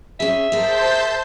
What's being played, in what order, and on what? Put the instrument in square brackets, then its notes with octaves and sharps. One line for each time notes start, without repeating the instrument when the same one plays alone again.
[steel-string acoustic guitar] C#4 G#4 [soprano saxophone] E5
[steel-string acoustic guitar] G#4 A#4 [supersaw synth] C5 A5 G6